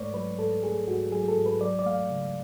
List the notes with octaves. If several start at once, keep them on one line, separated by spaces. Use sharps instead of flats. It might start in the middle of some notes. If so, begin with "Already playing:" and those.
Already playing: G#2 A3 B4 C#5 D5
F#3 B4
G#2 A4
A3 G#4
G#2 F#4
F#3 G#4
A4
G#2
B4
F#3 D5
D5
A3 F5
C#3